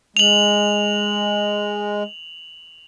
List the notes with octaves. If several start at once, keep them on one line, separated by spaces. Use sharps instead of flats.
G#3 F7 F#7